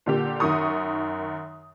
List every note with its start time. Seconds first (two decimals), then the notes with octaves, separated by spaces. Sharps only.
0.06 A#2 D3 G4
0.40 F#2 D#3 C#6 D#6